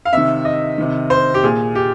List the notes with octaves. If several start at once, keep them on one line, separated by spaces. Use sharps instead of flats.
F5
C3 D#3 E5
D#5
C3 D#3
C5
G4
A#2 G#4
G4